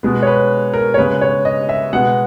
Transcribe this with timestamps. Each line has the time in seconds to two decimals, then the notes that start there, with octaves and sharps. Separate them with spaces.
0.03 B2 G#3 B3
0.23 C#5
0.27 B4
0.74 A#4
0.94 C#5
0.98 C#3 G#3 B3 B4
1.21 C#5
1.45 D#5
1.69 E5
1.93 B2 G#3 B3 F#5